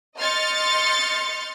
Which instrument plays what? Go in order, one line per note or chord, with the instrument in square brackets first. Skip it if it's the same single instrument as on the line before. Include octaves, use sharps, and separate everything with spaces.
[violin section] D#5 C6 F6 G6 A6 C#7